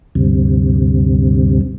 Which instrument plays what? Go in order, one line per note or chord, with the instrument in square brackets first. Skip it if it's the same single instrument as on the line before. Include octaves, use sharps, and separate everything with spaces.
[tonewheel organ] D2 G2 C3